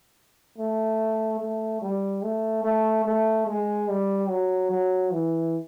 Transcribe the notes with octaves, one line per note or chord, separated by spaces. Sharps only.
A3
A3
G3
A3
A3
A3
G#3
G3
F#3
F#3
E3